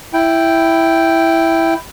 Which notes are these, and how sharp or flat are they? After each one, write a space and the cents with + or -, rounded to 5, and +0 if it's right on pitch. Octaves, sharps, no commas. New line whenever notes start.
E4 +0 G5 +0